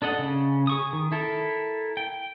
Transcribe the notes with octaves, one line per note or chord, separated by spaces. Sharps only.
D4 A4 D#5 F#5
C#3
G#4 C#6 D#6
D#3
E4 A4 A#4
G5